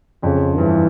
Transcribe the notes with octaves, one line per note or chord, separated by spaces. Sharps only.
F2 C#3
G2 E3